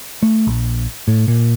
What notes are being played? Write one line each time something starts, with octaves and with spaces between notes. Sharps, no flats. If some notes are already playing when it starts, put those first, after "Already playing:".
A3
A#1
A2
A#2